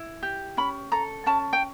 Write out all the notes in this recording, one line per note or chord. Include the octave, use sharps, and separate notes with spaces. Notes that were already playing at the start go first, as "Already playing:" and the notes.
Already playing: E4
G4
C#4 B5
A4 A#5
C#4 A5
G5